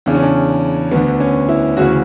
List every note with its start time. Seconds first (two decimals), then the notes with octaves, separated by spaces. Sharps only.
0.06 E2 C#3 E3 D4
0.15 C#4
0.23 D4
0.91 D2 D3 B3
1.20 C#4
1.49 E4
1.77 D2 C#3 E3 F#4